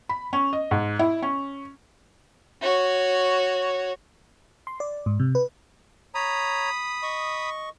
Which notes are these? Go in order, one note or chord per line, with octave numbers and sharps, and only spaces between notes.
B5
C#4
D#5
G#2
E4
C#4
F#4 C#5
C6
D5
G#2
C3
B4
C#5 A#5 B5 D#6
D#5 C#6